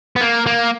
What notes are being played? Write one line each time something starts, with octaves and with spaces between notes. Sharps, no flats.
B3
A#3
A#3